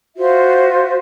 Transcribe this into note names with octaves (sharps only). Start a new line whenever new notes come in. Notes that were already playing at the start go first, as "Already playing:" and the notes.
F4 F#4 C5 E5